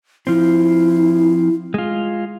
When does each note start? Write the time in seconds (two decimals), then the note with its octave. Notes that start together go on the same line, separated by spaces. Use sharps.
0.27 F3 C4 E4
1.74 G#3 F4